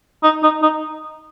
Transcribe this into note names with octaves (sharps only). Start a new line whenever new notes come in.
D#4
D#4
D#4